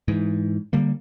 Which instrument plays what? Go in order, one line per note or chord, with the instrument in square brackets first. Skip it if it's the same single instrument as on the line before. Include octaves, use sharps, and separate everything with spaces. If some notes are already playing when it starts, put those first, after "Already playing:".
[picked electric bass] G#2 E3
D3 G3 A#3